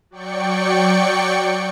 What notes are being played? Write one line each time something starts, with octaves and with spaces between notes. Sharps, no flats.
F#3 D5 G5 C#6 C#7